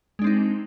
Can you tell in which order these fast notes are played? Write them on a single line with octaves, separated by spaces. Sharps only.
G#3 D4 C4 D#4